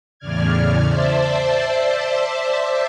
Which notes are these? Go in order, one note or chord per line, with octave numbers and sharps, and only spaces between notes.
E2 A2 C#3 D5 F6 G#6
C5 D5 E5 A5